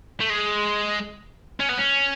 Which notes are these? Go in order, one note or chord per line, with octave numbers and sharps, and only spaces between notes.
A3
G#3
C#4
B3
C#4